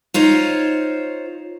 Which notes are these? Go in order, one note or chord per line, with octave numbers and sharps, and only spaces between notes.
D#4 F4 C5 C#5